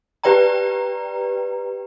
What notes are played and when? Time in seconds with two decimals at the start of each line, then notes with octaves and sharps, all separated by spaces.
0.23 G4 B4 D5 G5 A#5